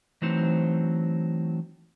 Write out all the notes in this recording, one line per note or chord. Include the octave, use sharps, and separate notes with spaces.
E3 F#3 A3 C4 D#4 C5